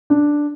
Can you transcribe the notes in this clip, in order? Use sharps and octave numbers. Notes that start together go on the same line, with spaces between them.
D4